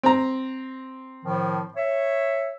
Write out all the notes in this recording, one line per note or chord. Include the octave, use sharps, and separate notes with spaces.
C4 A#5
A2 D#3 F3
C#5 E5